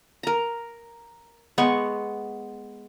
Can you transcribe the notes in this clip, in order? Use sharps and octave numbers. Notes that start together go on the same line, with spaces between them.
A#4 A#5
G#3 B3 C#6